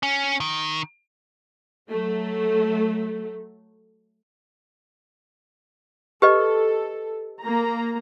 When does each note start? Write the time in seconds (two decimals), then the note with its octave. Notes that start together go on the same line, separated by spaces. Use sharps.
0.03 C#4
0.40 D#3
1.90 F#3 A3
6.22 G4 A4 B4 D#5
7.40 A#3 A#5